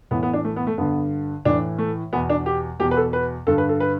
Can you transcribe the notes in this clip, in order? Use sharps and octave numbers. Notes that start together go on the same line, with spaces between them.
A2 E3 B3
B3
D4
A3
B3
A3
G2 D3 B3
A2 E3 D4
A3
E2 B2 B3
D4
G4
E2 B2 G4
B4
A4
B4
G2 D3 A4
B4
A4
B4